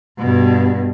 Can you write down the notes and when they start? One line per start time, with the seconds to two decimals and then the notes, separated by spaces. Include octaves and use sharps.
0.19 G2 B2